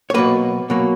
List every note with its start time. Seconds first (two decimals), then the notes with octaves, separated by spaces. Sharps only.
0.10 C#5
0.14 B2 F#3 A#3 B4
0.70 B2 F#3 A#3